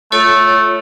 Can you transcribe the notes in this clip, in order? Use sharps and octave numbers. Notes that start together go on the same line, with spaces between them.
A3 F4 A4 C#5